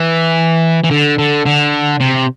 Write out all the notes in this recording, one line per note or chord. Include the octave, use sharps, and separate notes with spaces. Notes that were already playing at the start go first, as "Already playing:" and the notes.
Already playing: E3
E3
D3
D3
D3
C3